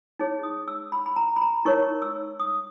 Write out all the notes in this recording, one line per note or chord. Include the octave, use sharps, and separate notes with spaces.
D#4 G#4 C#5
D#6
E6
B5
B5
A#5
B5
A#5
D#4 A#4 C#5 C#6
E6
D#6